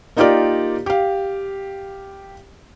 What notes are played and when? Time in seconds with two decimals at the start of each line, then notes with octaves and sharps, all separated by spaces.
0.17 A#3 D#4 F4 G4 A#4 D5
0.86 G4 F5